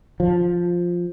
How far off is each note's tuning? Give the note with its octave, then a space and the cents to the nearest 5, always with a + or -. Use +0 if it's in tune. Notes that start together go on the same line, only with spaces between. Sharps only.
F3 +5